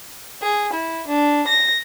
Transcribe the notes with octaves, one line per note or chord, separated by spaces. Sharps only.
G#4
E4
D4
A#6